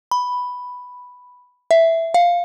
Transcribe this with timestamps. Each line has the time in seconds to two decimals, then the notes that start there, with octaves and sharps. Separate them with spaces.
0.11 B5
1.71 E5
2.14 F5